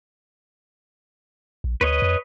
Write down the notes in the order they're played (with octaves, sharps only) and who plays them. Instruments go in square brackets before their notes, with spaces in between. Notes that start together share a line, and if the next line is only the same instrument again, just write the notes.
[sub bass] A#1
[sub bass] D2 [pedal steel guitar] B4 C#5 D#5
[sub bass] F2